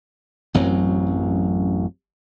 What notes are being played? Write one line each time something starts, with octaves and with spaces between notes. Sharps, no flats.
A1 F#2 F#3 C4